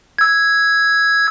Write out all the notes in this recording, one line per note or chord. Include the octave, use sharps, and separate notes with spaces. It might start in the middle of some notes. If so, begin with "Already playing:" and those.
E6 G#6